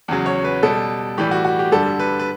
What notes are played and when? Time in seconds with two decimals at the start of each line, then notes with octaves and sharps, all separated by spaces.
0.08 E2 C#3 F#3
0.26 C#5
0.44 B4
0.63 B2 G3 A4
1.18 A2 E3 G3 G4
1.31 F#4
1.45 F#4
1.59 G4
1.72 G2 D3 G3 A4
2.00 B4
2.19 B4